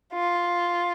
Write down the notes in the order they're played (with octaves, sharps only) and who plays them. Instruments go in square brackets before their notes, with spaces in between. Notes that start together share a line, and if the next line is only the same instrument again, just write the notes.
[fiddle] F4